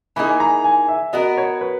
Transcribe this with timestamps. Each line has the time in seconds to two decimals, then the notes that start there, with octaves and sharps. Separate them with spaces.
0.16 E3 A#3 D#4 G#4 B5
0.40 A#5
0.64 G#5
0.88 E5
1.13 B3 F#4 A#4 D#5
1.37 C#5
1.61 B4